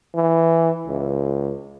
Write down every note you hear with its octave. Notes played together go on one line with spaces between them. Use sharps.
E3
C#2